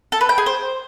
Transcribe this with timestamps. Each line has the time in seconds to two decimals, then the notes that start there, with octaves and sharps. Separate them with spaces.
0.12 A4
0.21 B4
0.29 G5
0.38 G#4
0.46 C5